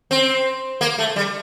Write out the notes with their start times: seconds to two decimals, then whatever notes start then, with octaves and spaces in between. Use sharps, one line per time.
0.11 C4
0.81 A#3
0.98 A3
1.16 G3